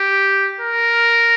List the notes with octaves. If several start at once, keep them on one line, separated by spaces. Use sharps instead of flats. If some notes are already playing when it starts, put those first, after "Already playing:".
Already playing: G4
A#4